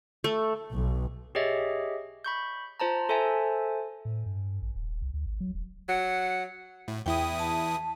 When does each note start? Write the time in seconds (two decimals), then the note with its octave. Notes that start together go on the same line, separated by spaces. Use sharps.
0.24 A3
0.71 B1
1.35 G4 G#4 C#5 D#5 E5
2.24 B5 C#6 G6
2.80 F4 C5 A5 A#5
3.09 A4 C5 E5 G#5 A5
4.05 A2
4.26 G2
4.62 A1
4.76 D#1
5.02 C2
5.14 D2
5.26 G#1
5.40 F#3
5.55 E1
5.89 F#3 F#5
6.88 A2
7.06 E2 E4 G5 D#6
7.39 A5